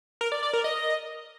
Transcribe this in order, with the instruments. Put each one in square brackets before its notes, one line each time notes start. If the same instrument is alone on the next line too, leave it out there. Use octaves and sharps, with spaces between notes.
[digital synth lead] A#4
D5
D5
A#4
D#5